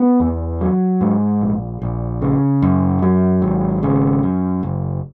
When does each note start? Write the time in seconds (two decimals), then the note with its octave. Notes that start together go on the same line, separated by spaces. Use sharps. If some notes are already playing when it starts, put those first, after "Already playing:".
Already playing: B3
0.20 E2
0.61 F#3
1.01 G#2
1.41 A#1
1.82 A#1
2.22 C#3
2.62 F#2
3.02 F#3
3.42 G#1
3.83 C#3
4.23 F#2
4.63 F#1